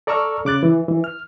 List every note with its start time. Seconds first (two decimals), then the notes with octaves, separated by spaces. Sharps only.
0.07 A4 D5 A#5 C#6 E6 F6
0.45 C#3 D6 F#6 A6
0.63 E3
0.88 E3
1.04 F6